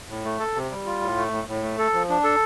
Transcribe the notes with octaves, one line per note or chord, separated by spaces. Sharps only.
A2
A3
A4
C3
G3
F4
A2
A3
A2
A2
A3
A4
F3
D4
A4